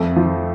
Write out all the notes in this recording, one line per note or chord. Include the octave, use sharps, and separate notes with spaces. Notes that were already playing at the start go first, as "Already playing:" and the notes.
Already playing: F2 A3 A4
F3